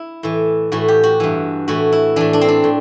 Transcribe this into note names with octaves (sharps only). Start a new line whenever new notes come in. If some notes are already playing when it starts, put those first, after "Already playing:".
Already playing: E4
A2 E3
A2 E3 F#4
G4
F#4
G2 E3
A2 E3 F#4
E4
A2 E3 D4
D4
C4
D4
A2